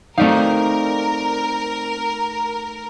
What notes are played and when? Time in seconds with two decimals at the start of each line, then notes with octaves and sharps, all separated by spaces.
0.18 A3 C4 D#4 A#4 D5 F5